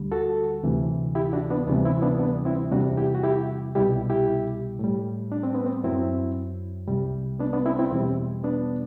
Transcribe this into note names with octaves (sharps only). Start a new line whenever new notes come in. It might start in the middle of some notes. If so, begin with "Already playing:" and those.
Already playing: D2 D3 G3
F#4 A4
D2 C3 E3
E4 G4
D4 F#4
B3 D4
D2 C3 E3 G3 B3 D4
C4 E4
B3 D4
B3 D4
C4 E4
E2 C3 G3 D4 F#4
E4 G4
F#4
E4 G4
C2 B2 G3 E4 G4
E4 G4
A2 G3
D4
C4
B3
C4
F#2 F#3 C4 E4
C2 C3 G3
B3 D4
B3 D4
C4 E4
C4 E4
E2 B2 G3 C4
B3 D4